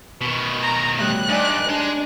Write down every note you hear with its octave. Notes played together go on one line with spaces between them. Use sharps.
B2 D#3
A#5
A2 E3 G3 F#6
G2 D#4 D5 G#5
G#3 D4 C6